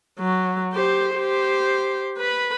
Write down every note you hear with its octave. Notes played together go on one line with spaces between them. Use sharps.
F#3
G4 C5
G4 C5
B4 B5